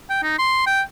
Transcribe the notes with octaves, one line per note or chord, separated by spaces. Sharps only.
G5
D#4
C6
G5